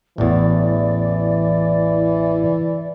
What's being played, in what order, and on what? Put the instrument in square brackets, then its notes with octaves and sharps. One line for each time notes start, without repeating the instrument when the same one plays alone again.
[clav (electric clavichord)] A1 E2 [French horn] E3 [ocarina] D5